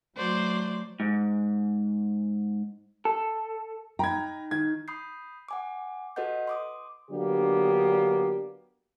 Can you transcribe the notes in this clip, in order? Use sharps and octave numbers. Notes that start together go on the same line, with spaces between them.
F#3 A3 C5 D5
G#2
A4
D#4 G5 A#5 B5 G#6
D#3 G#6
B5 D#6 G6 C7
F#5 G#5 D6
F#4 A4 B4 D#5 F#5 G6
C6 D6 D#6
D3 F#3 A#3 B3 D4 G4